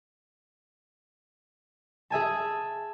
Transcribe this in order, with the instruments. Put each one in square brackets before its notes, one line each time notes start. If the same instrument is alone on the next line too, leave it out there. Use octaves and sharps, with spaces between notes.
[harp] G#4 E5 G#5 A5